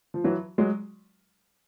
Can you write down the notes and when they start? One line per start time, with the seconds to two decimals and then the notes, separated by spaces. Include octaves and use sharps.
0.14 F3
0.24 E3 F#3
0.58 F#3 G#3